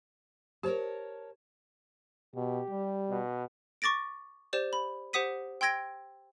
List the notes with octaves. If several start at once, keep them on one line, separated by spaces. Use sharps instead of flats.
G4 A#4 C5 C#5 A5
B2 G4
G3
B2
C#6 D6 A6 A#6 D7
G4 C5 D5 E7
B5
G4 C5 F#5 D#6 B6 D#7
G5 C6 E6 G#6 A#6 D7